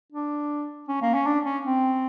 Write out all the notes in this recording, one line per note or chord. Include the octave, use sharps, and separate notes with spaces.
D4
C#4
A#3
C#4
D4
C#4
C4